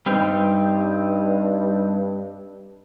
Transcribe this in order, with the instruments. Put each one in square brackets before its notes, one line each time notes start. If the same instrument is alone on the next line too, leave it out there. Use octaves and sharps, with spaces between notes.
[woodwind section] G2 [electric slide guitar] G3 C4 D#4